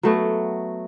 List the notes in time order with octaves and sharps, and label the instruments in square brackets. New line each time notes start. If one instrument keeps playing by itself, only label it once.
[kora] F#3 A3 B3